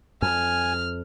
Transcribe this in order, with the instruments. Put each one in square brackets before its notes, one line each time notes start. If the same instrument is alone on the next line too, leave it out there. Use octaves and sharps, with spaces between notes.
[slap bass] F2 [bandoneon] G#5 [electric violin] F6